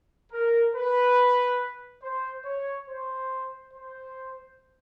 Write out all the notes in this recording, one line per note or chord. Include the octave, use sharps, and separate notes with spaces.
A#4
B4
C5
C#5
C5
C5